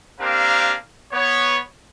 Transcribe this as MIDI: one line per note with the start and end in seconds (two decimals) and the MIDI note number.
0.19 0.75 58
0.19 0.75 60
0.19 0.75 62
0.19 0.75 67
0.19 0.75 70
0.19 0.75 77
1.12 1.60 59
1.12 1.60 73